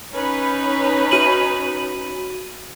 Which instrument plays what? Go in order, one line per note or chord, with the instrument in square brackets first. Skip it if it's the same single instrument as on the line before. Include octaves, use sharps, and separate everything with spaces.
[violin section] C#4 D#4 B4
[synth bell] F#4 D#7 F#7